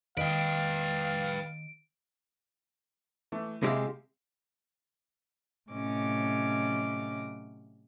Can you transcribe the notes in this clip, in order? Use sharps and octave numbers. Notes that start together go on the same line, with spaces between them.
D#3 B4 D#5 F5 G5 D7
E3 A3
C3 G#3 E4 G4 G#4 F5
A2 C3 F#3 C#4 D#5 D6